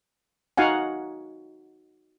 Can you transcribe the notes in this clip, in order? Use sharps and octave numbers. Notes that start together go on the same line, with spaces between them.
D#4 F#4 F5 F#5 G#5